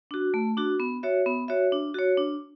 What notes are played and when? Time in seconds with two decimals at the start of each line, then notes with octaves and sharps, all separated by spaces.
0.11 D4 F#4
0.34 A3
0.57 D4 F#4
0.80 B3
1.03 F#4 C#5 E5
1.26 B3
1.48 F#4 C#5 E5
1.72 D4
1.94 F#4 C#5
2.17 D4